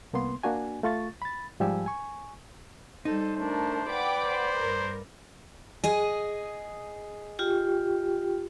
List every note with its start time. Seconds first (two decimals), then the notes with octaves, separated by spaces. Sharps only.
0.13 C2 A#3 B3 C6
0.43 A#3 D4 F#4 G#5
0.83 A3 F4 C#6 A6
1.22 B5 A6
1.60 G#2 F3 G3 G4 G#5 E6
1.86 G#5 C#6
3.05 G3 D#4 A4 C5
3.36 A3 D4 A#4 C5
3.90 B4 D5 F#5 G5 B5 D6
4.23 C5
4.55 G2 A#4
5.84 G#4 D#5
7.39 F4 G4 G5